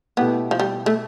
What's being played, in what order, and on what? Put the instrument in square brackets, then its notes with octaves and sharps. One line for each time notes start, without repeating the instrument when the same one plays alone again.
[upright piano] B2 A3 E4 G4 [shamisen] B3
[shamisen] F3
G3
A3